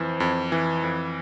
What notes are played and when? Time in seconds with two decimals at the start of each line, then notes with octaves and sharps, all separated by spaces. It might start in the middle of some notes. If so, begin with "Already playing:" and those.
Already playing: F2 E3 C5
0.20 F2
0.52 E3
0.84 F2